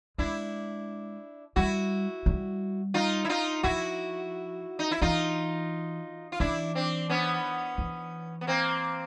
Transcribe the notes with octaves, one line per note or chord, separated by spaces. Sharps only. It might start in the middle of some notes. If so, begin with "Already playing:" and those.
G#3 D4 E4
G3 E4 F#4
G3
D#4 F4
E4
D#4 F4
F3 E4 F#4
D#4
E4
E3 D#4 F4
F4
E3 D4 E4
C4 D4
B3 C#4
E3
B3
A#3 C4